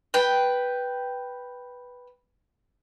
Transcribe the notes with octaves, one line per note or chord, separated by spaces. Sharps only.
B4 G5